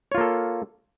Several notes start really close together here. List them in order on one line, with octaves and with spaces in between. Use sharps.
C#5 F4 A#3 A4